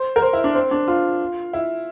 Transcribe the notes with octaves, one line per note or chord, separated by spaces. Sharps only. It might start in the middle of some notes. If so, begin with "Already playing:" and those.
Already playing: C5
A#4
C5
E4
D4
C4
D4
F4
E4